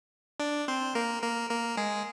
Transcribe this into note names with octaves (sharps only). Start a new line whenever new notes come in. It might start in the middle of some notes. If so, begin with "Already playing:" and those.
D4 D5
C4 C5
A#3 A#4
A#3 A#4
A#3 A#4
G#3 G#4